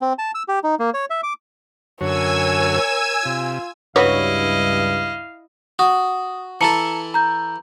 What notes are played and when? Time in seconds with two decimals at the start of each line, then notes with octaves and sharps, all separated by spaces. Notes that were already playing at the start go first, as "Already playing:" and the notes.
0.02 C4
0.19 A5
0.35 E6
0.48 G4
0.64 D#4
0.79 A#3
0.94 C#5
1.10 E5
1.23 D6
2.01 F#2 D3 F#4 A#4 C#5 G#5 E6 G#6
3.25 C3 F4
3.96 C#2 G2 F#3 E4 B4 C#5 D#5 F5
5.79 F#4 D#6
6.61 E3 E4 A4 A5 A#5 C#7
7.14 A#5 G6